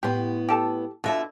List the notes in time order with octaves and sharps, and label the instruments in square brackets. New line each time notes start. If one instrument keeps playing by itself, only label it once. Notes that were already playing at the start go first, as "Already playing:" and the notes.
[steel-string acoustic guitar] A2 B3 [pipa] G4 C6
[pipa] G4 A4 A5
[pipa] B2 D3 E4 [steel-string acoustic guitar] F4 E5